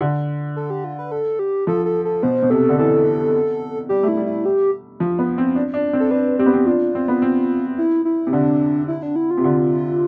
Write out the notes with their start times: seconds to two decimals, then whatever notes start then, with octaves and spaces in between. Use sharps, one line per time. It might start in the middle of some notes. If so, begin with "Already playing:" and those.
0.01 D3
0.56 A4
0.70 G4
0.84 F4
0.99 B4
1.12 A4
1.39 G4
1.67 F3 A4
1.85 A4
2.05 A4
2.23 B2 C5
2.42 B2
2.50 C3 A4
2.69 D3
2.79 E3 A4
3.89 G3 G4
4.03 A3
4.08 E4
4.17 G3
4.26 E4
4.45 G4
5.00 F3
5.19 B3
5.38 C4
5.55 D4
5.74 D4
5.93 C4
6.00 A4
6.11 D4 B4
6.39 C4 G4
6.46 B3
6.53 C4
6.66 D4 F4
6.95 C4
7.08 B3
7.22 C4
7.78 E4
8.05 E4
8.27 C3
8.33 D3 D4
8.88 E4
9.03 D4
9.16 E4
9.31 F4
9.37 C3
9.44 D3